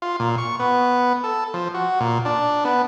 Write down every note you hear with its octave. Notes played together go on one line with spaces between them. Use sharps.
F4
A#2
C#6
B3
A4
F3
F#4
A#2
D4
B3